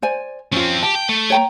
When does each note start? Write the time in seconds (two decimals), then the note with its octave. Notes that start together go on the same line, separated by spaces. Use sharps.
0.02 C5 D5 G#5
0.52 F3 C4 C#4 F4
0.83 G4 A5
0.95 G5
1.09 A3
1.30 C#5 G5 A#5